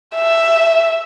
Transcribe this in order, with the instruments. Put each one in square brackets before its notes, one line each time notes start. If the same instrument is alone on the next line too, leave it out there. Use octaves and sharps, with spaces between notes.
[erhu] E5